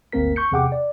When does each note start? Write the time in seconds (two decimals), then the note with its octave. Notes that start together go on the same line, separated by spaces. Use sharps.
0.12 G1 D2 A#3 C4 A#4 B6
0.36 C#6 G6 C#7
0.51 E2 C3 G#4 F#5 G5 D6
0.72 D5